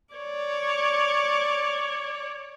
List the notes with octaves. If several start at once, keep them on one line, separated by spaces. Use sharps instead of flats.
C#5 D5